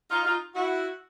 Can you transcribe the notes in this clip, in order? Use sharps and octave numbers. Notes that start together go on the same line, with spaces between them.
D#4 F4
D#4 F4
E4 F#4